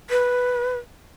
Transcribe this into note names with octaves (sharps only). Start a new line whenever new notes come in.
B4